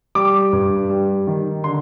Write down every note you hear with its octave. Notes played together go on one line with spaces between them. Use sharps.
G3 D6
G2
G3
D#3
D3 C6